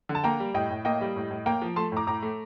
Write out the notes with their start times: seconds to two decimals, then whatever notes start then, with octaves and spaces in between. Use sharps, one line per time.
0.09 D3
0.15 A5
0.24 A#3 G5 A#5
0.40 G3
0.54 A2 D#5 G5
0.70 A2
0.85 A#3 D#5 G5
1.01 G3
1.16 A2
1.31 A2
1.46 A#3 G5 A#5
1.62 F3
1.76 A3 A5 C6
1.92 A2 A#5 D6
2.07 A2 A#5 D6
2.22 A3